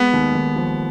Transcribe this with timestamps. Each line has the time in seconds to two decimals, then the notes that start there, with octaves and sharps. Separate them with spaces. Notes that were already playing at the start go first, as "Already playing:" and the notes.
Already playing: G#3 B3
0.13 D#2
0.35 D#2
0.56 F3